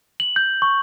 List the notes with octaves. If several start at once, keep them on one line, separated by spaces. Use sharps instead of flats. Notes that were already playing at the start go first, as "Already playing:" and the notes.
F#7
G6
C#6